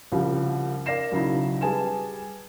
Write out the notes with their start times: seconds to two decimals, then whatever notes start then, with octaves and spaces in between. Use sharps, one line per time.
0.12 C2 C#3 F3 G3
0.86 A#4 D5 F5 A#6 C7 E7
1.12 B1 C#3 F#3 D#4 E4
1.61 G3 G#4 B4 G#5 A5 E7